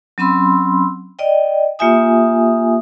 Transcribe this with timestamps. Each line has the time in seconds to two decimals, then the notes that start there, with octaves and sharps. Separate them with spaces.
0.18 F#3 C4 C#4 B5 C6 E6
1.19 D5 D#5 G5
1.79 A#3 F4 G4 E5 G#5 D#6